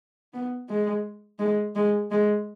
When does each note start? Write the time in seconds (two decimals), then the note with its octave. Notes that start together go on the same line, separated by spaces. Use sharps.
0.33 B3
0.69 G#3
1.39 G#3
1.75 G#3
2.11 G#3